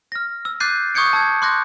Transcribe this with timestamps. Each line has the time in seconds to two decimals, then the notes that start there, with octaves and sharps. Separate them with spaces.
0.12 F6 A#6
0.45 E6
0.60 D6 F#6 G6 A6 C7 D#7
0.95 C#6 D#6 G6 G#6 C#7 D7
1.13 A5 E6 G#6
1.42 C6 D6 F#6 G6 A#6